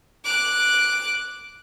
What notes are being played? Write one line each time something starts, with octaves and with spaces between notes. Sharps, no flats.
D6 F#6